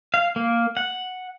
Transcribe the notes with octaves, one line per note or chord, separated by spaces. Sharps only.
F5
A#3
F#5